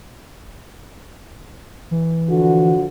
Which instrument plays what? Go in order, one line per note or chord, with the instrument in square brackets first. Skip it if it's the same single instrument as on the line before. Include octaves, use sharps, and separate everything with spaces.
[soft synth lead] E3
[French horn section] D3 F3 F#4